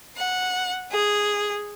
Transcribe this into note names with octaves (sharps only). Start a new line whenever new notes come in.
F#5
G#4